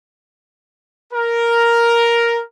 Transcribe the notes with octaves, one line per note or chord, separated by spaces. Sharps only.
A#4